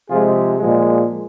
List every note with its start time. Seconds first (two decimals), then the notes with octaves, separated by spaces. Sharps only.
0.10 C3 F3 G#3 F4 G#4
0.58 A#2 F3 G#3